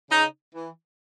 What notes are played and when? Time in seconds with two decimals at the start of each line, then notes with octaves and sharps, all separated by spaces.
0.10 C#3 D#4
0.55 E3